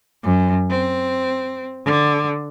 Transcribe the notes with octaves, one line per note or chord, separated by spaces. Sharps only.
F#2
C4
D3